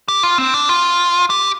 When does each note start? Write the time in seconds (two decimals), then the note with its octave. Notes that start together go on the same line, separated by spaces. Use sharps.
0.08 G4
0.23 F4
0.38 C4
0.54 D4
0.69 F4
1.30 G4